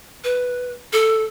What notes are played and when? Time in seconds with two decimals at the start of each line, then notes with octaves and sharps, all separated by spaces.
0.24 B4
0.93 A4